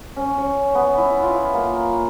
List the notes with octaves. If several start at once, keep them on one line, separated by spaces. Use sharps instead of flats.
C#4
C#5
B3
E4
F4
A#3